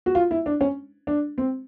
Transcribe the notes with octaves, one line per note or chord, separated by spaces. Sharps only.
F#4
F4
E4
D4
C#4
D4
C4